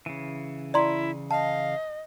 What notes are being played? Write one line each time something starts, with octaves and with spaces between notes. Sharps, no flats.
C#3 E3
E4 D5 A#5 C6
D#5 F5 A5